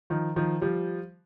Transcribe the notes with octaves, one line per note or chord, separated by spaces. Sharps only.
D#3 F3
D#3 F3
F3 G3